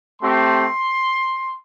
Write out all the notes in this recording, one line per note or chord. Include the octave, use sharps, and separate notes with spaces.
A3 C4 G4 C6